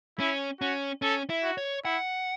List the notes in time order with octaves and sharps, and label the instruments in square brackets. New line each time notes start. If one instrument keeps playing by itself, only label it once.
[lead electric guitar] C#4 [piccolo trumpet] E4
[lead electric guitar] C#4 [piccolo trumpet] F#4
[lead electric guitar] C#4 [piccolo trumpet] A4
[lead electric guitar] E4
[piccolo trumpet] F#4
[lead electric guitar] C#5
[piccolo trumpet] E4 [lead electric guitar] F#5